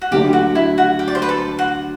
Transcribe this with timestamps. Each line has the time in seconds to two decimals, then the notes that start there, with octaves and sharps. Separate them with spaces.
0.01 F#4
0.11 D2 D3 F#3 A3 D4 G4
0.33 F#4
0.55 E4
0.78 F#4
0.99 G4
1.08 D5
1.15 C5
1.22 B4
1.29 A4
1.59 F#4